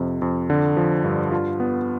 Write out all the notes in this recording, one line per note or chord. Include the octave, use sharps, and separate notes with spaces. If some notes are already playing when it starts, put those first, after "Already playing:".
Already playing: F2 C3
F2
D3
F3
G2
F4
B3